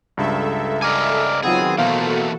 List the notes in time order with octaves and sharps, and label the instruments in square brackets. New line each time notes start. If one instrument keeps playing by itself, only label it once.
[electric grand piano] C#2 G2 [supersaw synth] A4 E5
[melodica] A#4 D6 [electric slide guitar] D5 D#5 G#5
[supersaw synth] D#3 F#3 F4 [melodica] B3 C4 [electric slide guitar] G#4
[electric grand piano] B2 F5 [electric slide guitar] E3 A3 A#3 [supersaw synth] F#4 A4 [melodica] C5